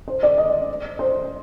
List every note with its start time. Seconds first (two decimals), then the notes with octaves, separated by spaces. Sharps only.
0.08 C5
0.23 D5
0.38 D#5
0.99 C5